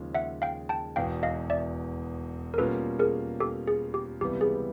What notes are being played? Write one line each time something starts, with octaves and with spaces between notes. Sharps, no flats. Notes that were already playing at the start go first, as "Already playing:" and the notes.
Already playing: D#2 C#3 F3 G#3
E5 F#5
F5 G5
G5 A5
E1 E2 B2 F5 G5
D#5 F5
D5 E5
A#4
B2 G3 A#3 C#4 F4 A4 B4
G#4 A#4
G4 A4
G#4
G4
C#2 C3 E3 G3 B3 G4
G#4